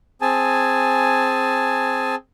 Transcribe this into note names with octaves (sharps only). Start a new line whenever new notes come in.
C4 G#4 G#5 A5